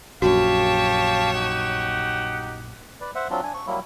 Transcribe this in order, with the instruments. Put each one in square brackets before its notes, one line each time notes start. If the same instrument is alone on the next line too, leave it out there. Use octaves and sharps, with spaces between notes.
[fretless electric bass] A#1 F#2 [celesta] F#4 [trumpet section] G4 F5 A5 [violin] C#5 E7
[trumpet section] D#4 G4 F#5
[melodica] B4 D5
C5 E5 F#5
F#3 C4 D4 F4
D4 G#5
C#6
F#3 G3 A#3 E4